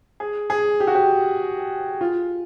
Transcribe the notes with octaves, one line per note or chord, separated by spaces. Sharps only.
G#4
G#4
G4
F#4
G4
F4